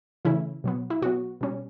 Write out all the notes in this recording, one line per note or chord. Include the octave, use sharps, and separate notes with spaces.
C#3 E3 A3 C#4 E4
B2 F#3 B3
E4
B2 F#3 B3 F#4
B2 G3 C#4